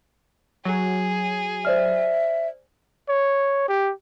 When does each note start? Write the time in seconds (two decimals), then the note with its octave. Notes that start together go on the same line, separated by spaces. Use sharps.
0.65 F#3 G#4
1.65 C5 D5 E5 F6
3.09 C#5
3.69 G4